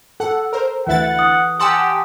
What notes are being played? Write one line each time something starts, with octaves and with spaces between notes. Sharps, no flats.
A4 F#5
A#4 C5
D2 E3 E4 F#5 A6
D#6
G4 F#5 G#5 A5 C6 D#6 E6